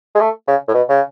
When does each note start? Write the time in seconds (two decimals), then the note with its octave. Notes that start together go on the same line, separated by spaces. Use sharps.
0.15 G#3
0.21 A3
0.48 C#3
0.68 A2
0.74 B2
0.89 C#3